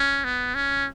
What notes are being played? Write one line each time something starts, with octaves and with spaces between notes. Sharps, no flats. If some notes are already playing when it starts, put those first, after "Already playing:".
Already playing: C#4
B3
C#4